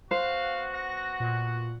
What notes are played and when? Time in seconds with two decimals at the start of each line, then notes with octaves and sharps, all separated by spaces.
0.11 B3 F#4 C5 F5 F#6
0.74 F#5 A#6
1.20 A#2